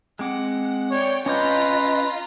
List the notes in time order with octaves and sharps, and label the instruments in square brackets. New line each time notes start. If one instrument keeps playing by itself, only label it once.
[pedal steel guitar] G#3 C4 D6 [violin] F#5
[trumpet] C#5 [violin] D5 G5
[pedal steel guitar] C#4 D6 G6 [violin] F4 A#5 [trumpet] B4 [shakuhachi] D#5